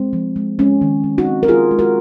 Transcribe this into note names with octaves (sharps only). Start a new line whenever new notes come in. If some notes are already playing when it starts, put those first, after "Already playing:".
Already playing: G#3 C4
F3
G#3
G#3 C#4
D#3
G#3
D#4 F#4
C4
A#4
G#3 F4 G#4
G#3
F#4 A#4